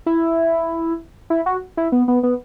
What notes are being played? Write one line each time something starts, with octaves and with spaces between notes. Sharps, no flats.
E4
E4
F#4
E4
B3
B3
B3